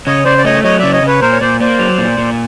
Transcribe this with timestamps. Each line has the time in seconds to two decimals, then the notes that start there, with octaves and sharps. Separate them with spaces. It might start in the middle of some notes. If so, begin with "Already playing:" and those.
0.06 C#3 C#5 D#5
0.25 C#3 C5 D5
0.38 D5
0.44 A3 C#5 D#5
0.64 F#3 C#5 D#5
0.79 C#3 D5 E5
0.92 C#5 D#5
1.02 C#3
1.07 B4 C#5
1.21 A#2 A#4 C5
1.32 C#5
1.41 A#2 C5 D5
1.60 A#3 C5 D5
1.79 F#3
1.98 A#2
2.18 A#2